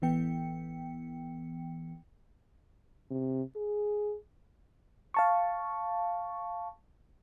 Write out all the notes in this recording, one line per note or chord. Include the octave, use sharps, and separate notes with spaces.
A1 E3 B3 G5 C#7
C3
G#4
F5 A5 C#6